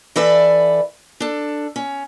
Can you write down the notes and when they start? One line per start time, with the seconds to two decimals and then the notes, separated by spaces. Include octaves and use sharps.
0.16 E3 A4 B4 D5 E5
1.20 D4 A4
1.76 C#4